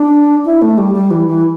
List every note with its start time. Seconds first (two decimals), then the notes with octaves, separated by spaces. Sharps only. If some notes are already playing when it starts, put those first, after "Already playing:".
Already playing: D4
0.45 E4
0.62 A3
0.78 G3
0.94 G3
1.11 E3
1.27 E3